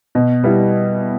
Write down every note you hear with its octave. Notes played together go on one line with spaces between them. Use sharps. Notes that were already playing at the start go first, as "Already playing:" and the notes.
B2
G3 B3 E4